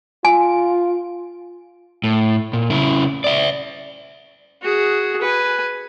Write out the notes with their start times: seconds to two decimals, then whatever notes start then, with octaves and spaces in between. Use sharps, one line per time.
0.25 F4 G#5
2.04 A2
2.53 A#2
2.70 C#3 E4
3.24 D5 E5
4.62 F#4 G#4
5.21 B4 G#5